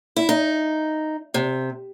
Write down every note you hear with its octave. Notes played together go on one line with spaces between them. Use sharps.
E4
D#4
C3